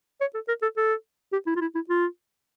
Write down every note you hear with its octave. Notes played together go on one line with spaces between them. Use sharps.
C#5
A4
A#4
A4
A4
G4
E4
F4
E4
E4
F4